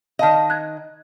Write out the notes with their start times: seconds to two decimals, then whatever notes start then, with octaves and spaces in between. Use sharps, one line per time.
0.19 D#3 D#5 F5 A5
0.50 F#6 G#6